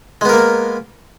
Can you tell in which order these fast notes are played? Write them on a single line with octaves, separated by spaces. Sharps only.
G#3 B3 A#4 A#3